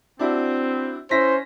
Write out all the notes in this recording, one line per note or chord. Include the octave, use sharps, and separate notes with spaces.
C4 D4 E4 F#4
C#4 E4 C5 A#6 B6